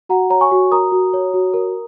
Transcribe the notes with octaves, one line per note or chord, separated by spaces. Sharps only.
F#4 F#5 A#5
C#5 A#5
G#5 C#6
F#4
A#4 A#5 D#6
F#4
C#5
F#4
A#4